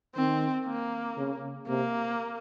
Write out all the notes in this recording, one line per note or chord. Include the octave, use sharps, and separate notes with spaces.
D#3 C4
A#3
C#3
C3 A#3